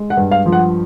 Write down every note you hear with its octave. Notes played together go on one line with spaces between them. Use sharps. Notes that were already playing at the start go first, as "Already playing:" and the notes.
Already playing: G#3
F#5
G2
F5
F3
F#5